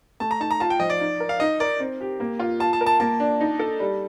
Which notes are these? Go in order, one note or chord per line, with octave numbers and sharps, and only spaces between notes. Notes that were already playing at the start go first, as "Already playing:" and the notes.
A3 A5
A#5
D#4 A5
A#5
F4 A5
G5
F3 D#5
D5
D#4
A#4
F5
D#4 D#5
A#4 D5
C4
G4
A#3
F4
F4 A5
A5
A#4
A5
A#3 A5
D4
D#4
A4
G3